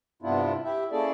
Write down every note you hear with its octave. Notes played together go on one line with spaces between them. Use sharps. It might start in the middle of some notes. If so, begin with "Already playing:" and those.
G2 C3 B3 D4 E4 F4
E4 G4 E5
A#3 C#4 E4 G#4 A4 D5